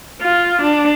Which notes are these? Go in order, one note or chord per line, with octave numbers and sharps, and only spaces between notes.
F4
D4